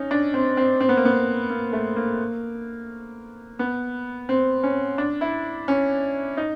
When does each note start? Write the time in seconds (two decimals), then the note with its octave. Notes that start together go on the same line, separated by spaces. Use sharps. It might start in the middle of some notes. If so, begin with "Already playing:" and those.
Already playing: C#4 D#4
0.11 D4
0.34 C4
0.57 C4
0.80 C4
0.89 B3
0.97 A#3
1.05 B3
1.50 A#3
1.73 A3
1.96 A#3
3.59 B3
4.29 C4
4.63 C#4
4.98 D4
5.21 E4
5.68 C#4
6.37 D#4